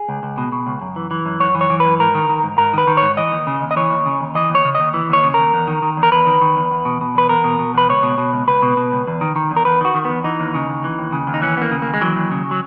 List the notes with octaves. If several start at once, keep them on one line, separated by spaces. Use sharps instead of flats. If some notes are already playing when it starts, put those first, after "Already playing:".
Already playing: G#4
C#2
C#2
B2
B2
C#2
F#2
E3
E3
F#2
F#2 C#5
E3
C#5
E3
B4
F#2
G#2 A#4
D#3
D#3
G#2
G#2 A#4
D#3 B4
D#3
C#5
G#2
E3 D#5
D#2
C#3
D#2
D#5
E3 C#5
D#2
C#3
D#2
E3 D#5
D#2 C#5
C#3
D#5
D#2
E3
D#2 C#5
C#3
D#2 A#4
E2
D#3
D#3
E2
A#4
E2 B4
D#3
D#3
E2
E2
B2
B2
E2 B4
E2 A#4
B2
B2
E2 B4
C#2 C#5
B2
B2
C#2
C#2 B4
B2
B2
C#2
E2
D#3
D#3
E2
A#4
E2 B4
D#3 F#4
D#3
E2 B3
E3 D#4
D#2
C#3
D#2
E3
D#2
C#3
D#2
D#4
E3 C#4
D#2 A#3 B3
C#3
D#2 A#3
G#3
E3 F#3
D#2
C#3
F#3